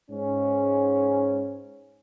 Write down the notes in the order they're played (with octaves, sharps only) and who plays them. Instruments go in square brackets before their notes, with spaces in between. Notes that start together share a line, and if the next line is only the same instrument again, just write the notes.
[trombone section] G#2 C#4